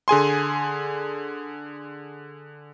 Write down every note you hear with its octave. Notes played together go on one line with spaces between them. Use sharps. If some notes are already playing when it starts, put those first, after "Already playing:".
D3 G#4 G#5 C6